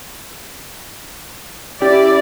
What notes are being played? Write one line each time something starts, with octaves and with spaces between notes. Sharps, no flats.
C#4 E4 G4 D5